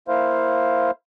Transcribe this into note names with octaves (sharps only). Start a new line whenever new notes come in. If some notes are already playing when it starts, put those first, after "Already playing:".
A#3 E4 C5 F5